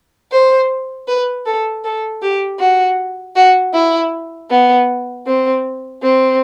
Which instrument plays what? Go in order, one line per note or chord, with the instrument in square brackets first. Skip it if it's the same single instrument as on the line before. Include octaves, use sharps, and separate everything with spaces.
[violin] C5
B4
A4
A4
G4
F#4
F#4
E4
B3
C4
C4